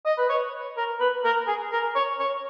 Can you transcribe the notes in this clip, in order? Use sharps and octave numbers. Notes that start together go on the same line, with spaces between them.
D#5
B4
C#5
A#4
B4
A#4
G#4
A#4
C#5
C#5